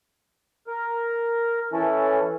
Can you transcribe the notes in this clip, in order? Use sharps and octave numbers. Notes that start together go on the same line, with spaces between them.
A#4
E3 C#4 E4 A4